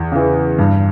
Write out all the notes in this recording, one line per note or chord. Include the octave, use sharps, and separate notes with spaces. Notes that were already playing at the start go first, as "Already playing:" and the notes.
Already playing: E2
C#3 E3
G2